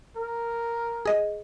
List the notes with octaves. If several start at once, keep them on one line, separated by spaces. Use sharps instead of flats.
A#4
G#4 D#5